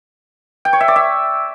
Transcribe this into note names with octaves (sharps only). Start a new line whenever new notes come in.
G5
C#5
E5
D5
E5